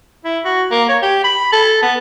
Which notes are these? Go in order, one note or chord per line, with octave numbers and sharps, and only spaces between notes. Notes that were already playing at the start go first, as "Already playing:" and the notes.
E4
F#4
A#3
C#5
G4
B5
A4
B3